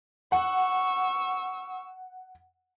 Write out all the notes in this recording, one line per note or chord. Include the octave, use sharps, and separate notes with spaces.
F#5 C#6 E6